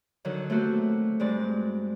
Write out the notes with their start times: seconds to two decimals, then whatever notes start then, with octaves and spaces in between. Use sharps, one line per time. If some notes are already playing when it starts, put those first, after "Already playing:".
0.25 D3 D#3 F#3
0.50 A3 A#3 C4 F#4 G4
1.20 G2 G#3 C4 D5